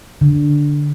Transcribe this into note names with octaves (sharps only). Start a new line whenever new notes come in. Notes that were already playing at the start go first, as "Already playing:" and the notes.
D3